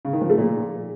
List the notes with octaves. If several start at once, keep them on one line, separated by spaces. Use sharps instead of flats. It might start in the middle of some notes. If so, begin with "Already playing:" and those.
C#3
D#3
F3
A3
A#2